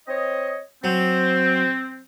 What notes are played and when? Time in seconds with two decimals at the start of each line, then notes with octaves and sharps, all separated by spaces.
0.08 C4 C#5 D#5
0.84 F#3 C4